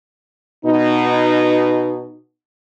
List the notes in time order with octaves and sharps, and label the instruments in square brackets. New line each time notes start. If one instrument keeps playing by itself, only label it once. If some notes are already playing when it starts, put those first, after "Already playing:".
[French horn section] B2 D#4